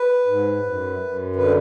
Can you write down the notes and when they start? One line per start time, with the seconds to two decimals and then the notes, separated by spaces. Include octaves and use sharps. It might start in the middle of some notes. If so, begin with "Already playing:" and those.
Already playing: B4
0.26 G#2
0.63 F#2
0.99 F#2
1.36 D3 B4